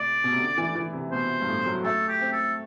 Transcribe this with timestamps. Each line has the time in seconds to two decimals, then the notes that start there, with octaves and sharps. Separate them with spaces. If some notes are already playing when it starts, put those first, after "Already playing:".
Already playing: A2 C3 D5
0.24 B2
0.32 C3
0.40 D3
0.58 E3
0.76 E3
0.93 C3
1.12 B2 C5
1.41 G2
1.49 A2
1.66 F#3
1.84 A3 A4
2.08 G4
2.21 C4
2.32 A4